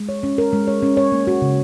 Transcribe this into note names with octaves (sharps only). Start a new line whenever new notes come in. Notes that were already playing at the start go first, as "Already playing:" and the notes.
Already playing: G#3
C#5
C#4
A#4
G#3
C#5
C#4
C#5
A#3
F#4
C#3